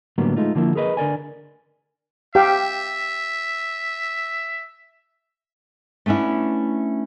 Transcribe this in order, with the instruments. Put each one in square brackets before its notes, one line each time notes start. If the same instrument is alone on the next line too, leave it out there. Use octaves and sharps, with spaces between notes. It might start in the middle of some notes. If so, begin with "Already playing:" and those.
[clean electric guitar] A2 D3 F#3 G3 A#3 B3
G#3 A3 D#4 F4
D3 F3 A#3 E4
G#4 A#4 B4 D#5
D3 A#4 D5 G#5
[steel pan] G4 F5 G5 [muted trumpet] E5
[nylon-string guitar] A3 B3 C#4 D4 E4